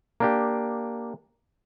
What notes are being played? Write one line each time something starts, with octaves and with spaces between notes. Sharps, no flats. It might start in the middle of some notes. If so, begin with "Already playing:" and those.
A#3 D4 G4